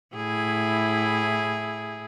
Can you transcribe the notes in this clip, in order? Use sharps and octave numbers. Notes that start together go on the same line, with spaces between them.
A2 E4 G#4